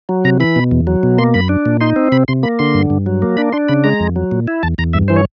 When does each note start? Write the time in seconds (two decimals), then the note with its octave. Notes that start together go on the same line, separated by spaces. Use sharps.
0.09 F#3
0.24 C3 A#5
0.40 E3 B5
0.56 B2
0.71 E2
0.87 F#3
1.03 B2
1.18 A#3 C6
1.34 F#2 B5
1.49 D4
1.66 A#2
1.81 D#4 C6
1.96 C4
2.12 C3 B5
2.28 C3 C6
2.43 A#3 B5
2.59 D3 C6
2.74 G2
2.90 G2
3.06 F#3
3.22 A#3
3.37 D4 B5
3.53 D4 C6
3.69 C#3 B5
3.84 G#3 A#5
4.00 F2
4.16 F#3
4.31 A#2
4.48 E4
4.63 E2 A5
4.78 E2 A#5
4.93 G2 E5
5.08 E3 C5
5.16 C#5